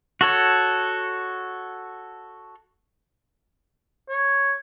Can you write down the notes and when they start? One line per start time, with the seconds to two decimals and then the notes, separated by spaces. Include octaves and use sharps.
0.21 F#4 A4 C#5
4.10 C#5